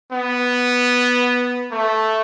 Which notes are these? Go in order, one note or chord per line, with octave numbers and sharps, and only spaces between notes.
B3
A3